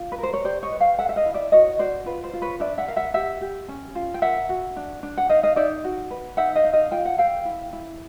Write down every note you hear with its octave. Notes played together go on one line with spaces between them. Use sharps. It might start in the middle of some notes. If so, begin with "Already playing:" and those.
Already playing: F4
B4
A#4 C5
C#5
G4 C5 D5
C#5 D#5
B4
F5 G5
A4 E5 F#5
E5
D#5 F5
E4
D5 E5
F#4 C#5 D#5
F#4 C5 D5
F4 B4
C5
F4
B4 C#5
D4 D5 E5
E5 F#5
A#4 F5
E5 F#5
G4 E5 F#5
G4
C#4
F4
G5
A#4 E5 F#5
F#4
D4
D4
F#5
D#4 D#5 F5
D#5 F5
D#4 D5 E5
F#4
B4
D#4 E5 F#5
D#5 F5
D#4
D#5 F5
F4 G5
F#5
A4 F5 G5
E4
E4